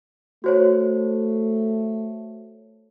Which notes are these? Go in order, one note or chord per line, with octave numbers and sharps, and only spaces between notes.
A3 F#4 C5 C#5